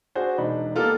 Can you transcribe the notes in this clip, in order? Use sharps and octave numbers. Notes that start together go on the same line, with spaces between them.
D4 F#4 G#4 C5
E1 D4 D#4 B5
A#3 B3 F4 G4 A4 A#4